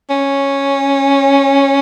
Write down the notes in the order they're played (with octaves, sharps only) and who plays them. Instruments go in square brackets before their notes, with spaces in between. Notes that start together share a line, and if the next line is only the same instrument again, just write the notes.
[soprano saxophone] C#4